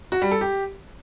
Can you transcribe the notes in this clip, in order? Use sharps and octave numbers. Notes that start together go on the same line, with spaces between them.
F#4
G3
A4
G4